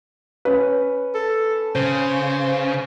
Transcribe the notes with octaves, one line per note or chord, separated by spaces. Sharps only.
C#4 B4
A4
C#3 C5